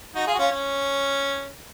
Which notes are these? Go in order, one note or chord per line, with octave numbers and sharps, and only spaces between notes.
D#4 F#4
F4 G#4
F#4
C#4 F4
C#4